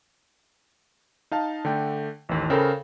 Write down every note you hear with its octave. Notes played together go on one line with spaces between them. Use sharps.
D#4 F5 A5
D3 A3 G5
A1 D#2
C#3 A4 A#4 C5 G5 B5